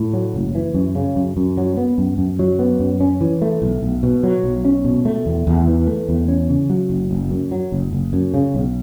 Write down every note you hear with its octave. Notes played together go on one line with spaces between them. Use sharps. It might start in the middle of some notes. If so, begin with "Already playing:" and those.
Already playing: A2
F#3
F#1
E3
F#2
C#3
F#2
F#2
F#3
B3
F#2
F#2
F#3
B3
F#2
C#4
E3
A3
B1
B1
B2
F#3
B1
C#4
B2
A3
E2
E2
E3
A3
E2
C#4
C#3
F#3
F#1
F#1
F#2
F#3
F#1
F#1
F#2
C#3
B1